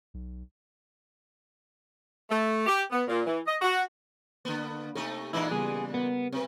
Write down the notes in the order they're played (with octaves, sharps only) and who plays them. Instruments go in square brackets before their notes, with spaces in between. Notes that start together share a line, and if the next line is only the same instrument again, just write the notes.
[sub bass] B1
[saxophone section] A3
G4
B3
A#2
E3
D#5
F#4
[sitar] D3 B3 [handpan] A#3
[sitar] C3 A3 D#4 [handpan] A4
[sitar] A#2 E3 G#3 [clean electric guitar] D#4 E4
[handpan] C#3 G3 B3 [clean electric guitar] G#4
[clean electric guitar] B3 [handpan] A#4
[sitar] C3 [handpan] C4 B4